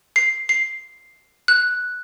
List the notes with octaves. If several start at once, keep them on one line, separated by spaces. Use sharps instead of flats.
C7
C7
F#6